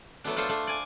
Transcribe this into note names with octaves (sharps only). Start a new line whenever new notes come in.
F#3 A3 B3 D4
D4 F4 A4 C5
A3 D4
D5 G#5